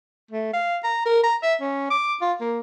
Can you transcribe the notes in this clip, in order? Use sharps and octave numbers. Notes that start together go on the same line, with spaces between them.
A3
F5
A#5
A#4
A#5
E5
C#4
D6
F4
A#3